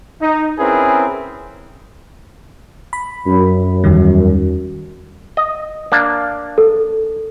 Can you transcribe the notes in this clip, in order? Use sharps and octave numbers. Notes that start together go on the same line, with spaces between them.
D#4
C4 C#4 E4 G#4 A#4 B4
B5
F#2
E2 D#3 G3
D#5
A#3 D4
A4